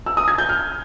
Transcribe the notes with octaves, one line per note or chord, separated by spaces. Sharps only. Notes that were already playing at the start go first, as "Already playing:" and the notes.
E6
D#6
G#6
G6
F6